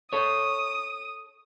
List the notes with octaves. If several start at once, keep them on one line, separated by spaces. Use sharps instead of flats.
A4 C#5 D#6